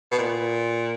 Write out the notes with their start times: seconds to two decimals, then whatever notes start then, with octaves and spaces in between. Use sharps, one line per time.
0.12 B2
0.18 A#2